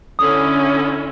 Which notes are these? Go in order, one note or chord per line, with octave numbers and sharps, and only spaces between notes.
D3 C#4 E4 D#6